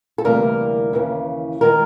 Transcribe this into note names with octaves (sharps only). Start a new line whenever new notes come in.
A4
D2 C3 E3 G3 A#3 A#4
D#2 C#3 E3
D#3 G#3 A#4